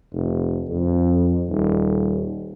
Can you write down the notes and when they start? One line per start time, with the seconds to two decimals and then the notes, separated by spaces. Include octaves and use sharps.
0.14 F1
0.69 F2
1.49 D#1